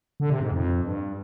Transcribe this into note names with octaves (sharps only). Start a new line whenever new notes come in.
D3
C3
G#2
F2
G2